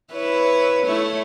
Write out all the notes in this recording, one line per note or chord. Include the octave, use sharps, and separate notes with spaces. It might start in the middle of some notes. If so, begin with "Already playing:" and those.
E4 B4 C#5
A3 E4 C#5